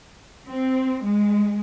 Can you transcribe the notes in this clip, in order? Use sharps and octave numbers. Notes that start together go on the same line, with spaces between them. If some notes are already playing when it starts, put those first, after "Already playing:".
C4
G#3